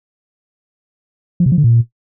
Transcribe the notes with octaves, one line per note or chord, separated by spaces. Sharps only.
F3
C3
F3
D3
A#2